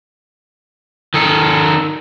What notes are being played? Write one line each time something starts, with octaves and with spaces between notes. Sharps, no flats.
D#3 A4